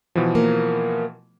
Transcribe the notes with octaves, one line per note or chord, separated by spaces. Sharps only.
B2 E3 F3
A#3